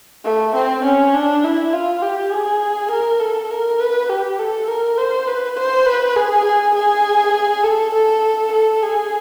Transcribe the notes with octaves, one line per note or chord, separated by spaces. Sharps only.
A3
C4
C#4
D4
E4
F4
G4
G#4
A#4
A4
A#4
B4
G4
A4
A#4
C5
B4
C5
B4
G#4
G#4
G#4
A4
A4
A4
G#4